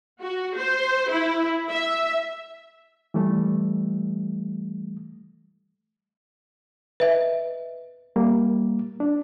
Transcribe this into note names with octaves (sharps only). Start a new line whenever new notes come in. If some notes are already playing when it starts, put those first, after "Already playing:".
F#4
C5
E4
E5
E3 G3 A3
B4 D#5 E5
G3 A#3
D4